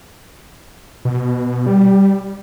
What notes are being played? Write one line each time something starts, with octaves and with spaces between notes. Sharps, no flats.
B2
G3